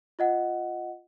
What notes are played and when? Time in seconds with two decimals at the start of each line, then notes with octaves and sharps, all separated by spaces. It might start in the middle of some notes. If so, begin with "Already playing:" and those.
0.19 F4 D#5 F#5